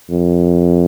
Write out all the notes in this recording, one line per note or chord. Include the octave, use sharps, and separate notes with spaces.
F2